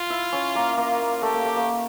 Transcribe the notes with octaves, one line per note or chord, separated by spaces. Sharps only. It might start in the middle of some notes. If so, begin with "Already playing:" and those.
Already playing: F4
E4 E5
C#4 C#5
A#3 A#4
A#3 F4 A#4
A3 G4 A4
A#3
A3
A#3